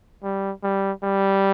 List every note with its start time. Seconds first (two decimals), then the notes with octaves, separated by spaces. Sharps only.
0.23 G3
0.63 G3
1.04 G3